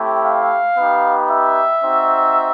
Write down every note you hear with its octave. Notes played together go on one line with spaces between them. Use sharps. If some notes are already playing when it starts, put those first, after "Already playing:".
Already playing: A3 C4 E4 G4
F5
B3 D#4 G4
E5
C4 D#4 F#4